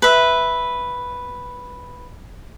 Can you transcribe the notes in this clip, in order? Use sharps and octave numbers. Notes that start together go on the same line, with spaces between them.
B4 E5